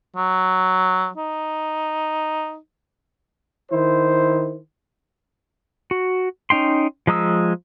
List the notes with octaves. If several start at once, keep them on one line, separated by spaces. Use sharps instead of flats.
F#3
D#4
D#3 E4 C5
F#4
C#4 D#4 G5 C6
F3 G#3 A#5 D#6 E6